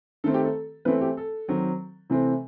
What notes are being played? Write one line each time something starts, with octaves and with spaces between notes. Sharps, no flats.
D#3 A3 C4 A4
G4
A4
E3 A3 B3 C4 B4
G4
A4
D#3 F#3 C4
C3 E3 A3 C4